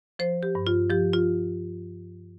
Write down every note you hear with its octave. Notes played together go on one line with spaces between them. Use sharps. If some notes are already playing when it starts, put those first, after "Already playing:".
F3 C5
G4
G2
F4
F3 G4
F4